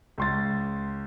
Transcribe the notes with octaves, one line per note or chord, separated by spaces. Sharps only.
C#2 C6 A6